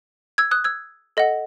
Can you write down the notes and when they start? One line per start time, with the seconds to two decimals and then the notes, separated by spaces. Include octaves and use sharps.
0.38 E6 G#6
0.51 D#6 F#6
0.64 E6 G#6
1.17 A4 D#5 F#5